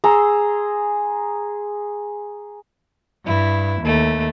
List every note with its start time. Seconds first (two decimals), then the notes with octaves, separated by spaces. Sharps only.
0.04 G#4 A#5 C6 E6
3.25 G2 E4
3.82 D#2 A3